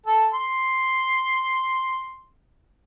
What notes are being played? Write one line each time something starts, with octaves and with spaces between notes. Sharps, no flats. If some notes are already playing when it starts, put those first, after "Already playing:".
A4
C6